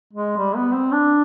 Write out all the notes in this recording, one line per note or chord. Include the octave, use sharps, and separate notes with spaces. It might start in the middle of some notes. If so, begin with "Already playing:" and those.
G#3
G3
B3
C4
D4